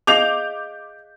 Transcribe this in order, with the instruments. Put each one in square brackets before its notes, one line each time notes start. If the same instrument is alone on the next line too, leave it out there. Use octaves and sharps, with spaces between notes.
[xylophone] G#4 D#5 F5 [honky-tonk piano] D6 G6 F7